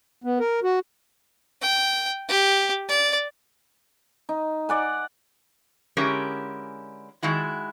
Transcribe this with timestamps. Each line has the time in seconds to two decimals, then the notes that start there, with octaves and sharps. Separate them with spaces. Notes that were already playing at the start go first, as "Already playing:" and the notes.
0.24 B3
0.40 A#4
0.63 F#4
1.62 G5
2.29 G4
2.88 D5
4.29 D#4
4.69 D5 F#5 G#5
5.97 D3 G#3 C#4 E4 G4 A#4
7.23 D#3 G#3 E4 F#4